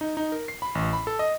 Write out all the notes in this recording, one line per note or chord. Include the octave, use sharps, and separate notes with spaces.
D#4
D#4
A#4
C7
B5
A1
B5
A4
D#5